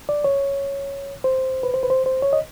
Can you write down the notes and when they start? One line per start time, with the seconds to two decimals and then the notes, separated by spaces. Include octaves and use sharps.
0.09 D5
0.24 C#5
1.24 C5
1.63 B4
1.74 C5
1.83 B4
1.90 C5
2.06 C5
2.22 C#5
2.33 D#5